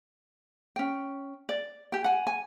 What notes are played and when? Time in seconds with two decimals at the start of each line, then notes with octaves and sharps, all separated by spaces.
0.76 C#4 G5
1.49 D5
1.92 G4 G5
2.04 F#5 G#5
2.27 G#5